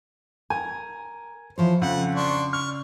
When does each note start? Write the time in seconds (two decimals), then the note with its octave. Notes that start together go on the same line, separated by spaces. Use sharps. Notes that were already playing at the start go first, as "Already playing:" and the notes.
0.50 A#4 G#5
1.58 E3 F3 C5 C#5
1.82 F2 C#3 F#5
2.15 D4 C6 C#6
2.53 C#6 F6